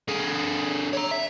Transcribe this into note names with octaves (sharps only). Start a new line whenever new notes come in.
D3 G#4
C#5 A#5
E5